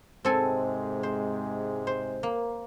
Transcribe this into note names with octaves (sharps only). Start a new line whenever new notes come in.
G#2 C3 G#3 C4 A4 G#5
C5
C5
A#3